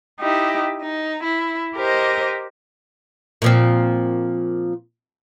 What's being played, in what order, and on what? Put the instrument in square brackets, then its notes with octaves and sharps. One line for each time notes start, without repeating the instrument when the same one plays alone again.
[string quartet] D#4 E4 G4
D#4
E4
G4 A#4 C5 D#5
[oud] A#2 F3 C4